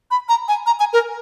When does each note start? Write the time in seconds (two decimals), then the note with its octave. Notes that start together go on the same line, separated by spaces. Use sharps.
0.11 B5
0.29 A#5
0.48 G#5
0.67 A#5
0.80 G#5
0.93 A#4